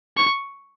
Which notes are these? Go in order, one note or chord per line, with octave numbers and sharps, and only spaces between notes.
C#6